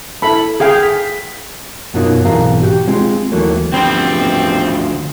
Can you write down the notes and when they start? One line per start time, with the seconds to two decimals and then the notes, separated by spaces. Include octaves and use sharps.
0.22 E4 A4 B5
0.60 G#4 F5 G5
0.83 B6
1.94 F#2 B2 F#3 A#3 D#4 F4
2.25 B1 G#2 E3 C4 A#4 F5
2.62 F#4 G4
2.88 G#3 C4 F4
3.32 D#2 D#3 E3 F#3 A3 A#3
3.73 D2 F3 G3 B3 C4